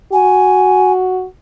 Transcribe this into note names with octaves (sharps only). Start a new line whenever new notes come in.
F#4 G#5